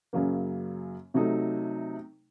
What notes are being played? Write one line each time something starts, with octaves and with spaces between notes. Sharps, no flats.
F#2 C#3 F#3 A#3
C3 F#3 A3 D#4